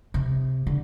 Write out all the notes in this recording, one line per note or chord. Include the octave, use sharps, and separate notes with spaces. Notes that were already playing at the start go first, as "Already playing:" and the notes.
C3
D3